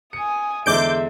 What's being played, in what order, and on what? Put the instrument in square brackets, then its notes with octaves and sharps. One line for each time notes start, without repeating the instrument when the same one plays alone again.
[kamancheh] G#5 D#6 [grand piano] C#7
[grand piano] E2 D3 G#3 [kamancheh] C5 E5 [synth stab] D6 G6 D7